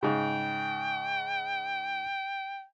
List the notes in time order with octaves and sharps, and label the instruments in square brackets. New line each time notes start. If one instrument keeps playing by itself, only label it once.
[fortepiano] G#2 C#3 [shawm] G5